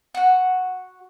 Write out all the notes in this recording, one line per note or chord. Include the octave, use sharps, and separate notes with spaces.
F#4 F#5